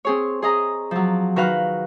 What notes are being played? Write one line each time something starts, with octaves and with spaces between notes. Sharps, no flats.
C4 G#4 C#5
G#4 D#5 A#5
F3 F#3
D#3 F#4 B4 F5 F6 F#6